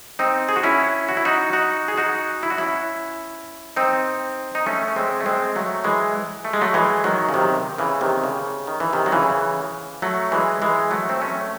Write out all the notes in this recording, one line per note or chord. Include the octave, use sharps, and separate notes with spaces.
C4 D#4
G#4
F#4
C#4 E4
F#4
E4
D#4 F#4
D#4 F#4
G#4
D#4 F#4
E4
F#4
C#4 E4
C4 D#4
D#4
A3 C#4
C#4
G#3 C4
A3
G#3 C4
F#3 A3
E3 G#3
A3
G#3
F#3 A3
E3 G#3
D#3 F#3
C#3
C3 D#3
C#3 E3
C3 D#3
C#3
D#3
E3
C3 D#3
F#3
C#3 E3
F#3 A3
E3 G#3
E3 G#3
F#3 A3
C4
A3 C#4